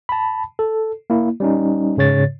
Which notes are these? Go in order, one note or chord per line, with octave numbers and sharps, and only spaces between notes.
A5 B5
A4
A#3 E4
G3 C#4 D#4
G#2 C#3 C#5 A6